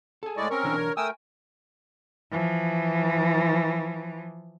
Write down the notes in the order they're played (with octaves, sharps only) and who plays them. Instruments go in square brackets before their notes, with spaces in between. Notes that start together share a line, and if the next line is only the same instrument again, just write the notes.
[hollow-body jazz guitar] G#4 A4
[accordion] A2 G#3 D5 [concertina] E4 D#5 C#6
[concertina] C4 C#4 C#6 [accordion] A#4
[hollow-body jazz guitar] B1 E3 D4
[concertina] C#5
[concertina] A3 A#4 G5 [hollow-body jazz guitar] G#5 [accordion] D#6 E6
[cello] E3 F3